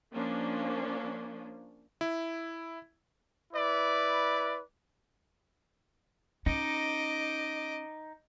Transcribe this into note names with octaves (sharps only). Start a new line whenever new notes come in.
F3 A#3 C#4 D4
E4
E4 B4 D5
C#4 D#4 D#5 D6